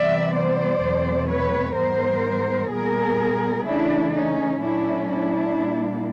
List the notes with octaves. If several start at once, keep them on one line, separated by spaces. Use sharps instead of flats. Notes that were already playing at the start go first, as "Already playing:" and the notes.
Already playing: C3 E3 G3 B3 D5 E5
C5 D5
E2 B2 F#3 A3 C4
B4 C#5
G#2 E3 G3 B3 A#4 C5
A#2 G3 B3 G#4 A#4
C#3 E3 A3 C#4 D4 E4
C#4 D#4
A#2 F#3 A3 C#4 D4 E4
D4 E4
A#2 G3 A#3